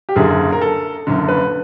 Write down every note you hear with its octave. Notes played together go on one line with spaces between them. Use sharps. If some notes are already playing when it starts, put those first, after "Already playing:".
G4
F#1 F#2 D3 G#4
A#4
A4
F#1 F#2 D3
B4